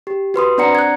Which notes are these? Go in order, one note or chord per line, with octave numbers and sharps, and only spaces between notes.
G4
F#4 B4 C6 D#6
C4 D4 D5 F#5 A#5 C#7
F#6 G#6